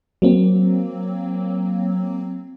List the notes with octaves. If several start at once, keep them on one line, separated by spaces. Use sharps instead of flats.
F#3 A#3 C4